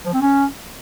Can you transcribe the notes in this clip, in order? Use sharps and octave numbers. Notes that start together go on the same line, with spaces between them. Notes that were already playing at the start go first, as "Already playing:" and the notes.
F3
C4
C#4